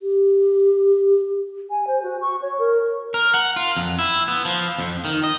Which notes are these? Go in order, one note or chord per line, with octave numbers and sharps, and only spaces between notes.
G4
G#5
C5
F#4
C#6
C#5
A#4
A#4
F#5
F4
F2
E4
B3
F3
F2
D#3
D#5